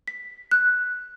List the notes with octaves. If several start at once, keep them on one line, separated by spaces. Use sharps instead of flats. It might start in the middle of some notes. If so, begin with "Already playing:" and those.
B6
F#6